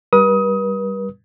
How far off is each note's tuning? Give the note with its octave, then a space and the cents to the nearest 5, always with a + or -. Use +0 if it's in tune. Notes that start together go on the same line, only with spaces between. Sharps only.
G3 +0 B4 -40 D#6 +25